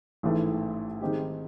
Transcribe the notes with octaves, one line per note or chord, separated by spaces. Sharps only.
A1 G#2 E3 A3
D#3 G#3 C4 D#4 G4